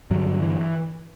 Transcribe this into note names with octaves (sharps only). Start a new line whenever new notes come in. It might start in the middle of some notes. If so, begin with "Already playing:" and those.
G2 D3 F#3
E3